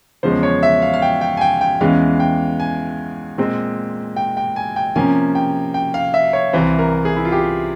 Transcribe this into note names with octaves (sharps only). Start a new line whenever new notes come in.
E2 C#3 F3 G#3 C#4 C5
C#5
E5
F5
F5
G5
G5
G#5
G5
G5
E2 E3 G#3 C#4 F5
G5
G#5
A#2 G#3 C4
G5
G5
G#5
G5
C3 F3 A#3 C#4 G#5
G5
G5
F5
E5
C#5
C2 C3 E3 C5
A#4
G#4
E4
F4
G4